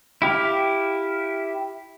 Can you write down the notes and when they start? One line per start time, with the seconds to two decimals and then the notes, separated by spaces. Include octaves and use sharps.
0.22 E4 G4 F5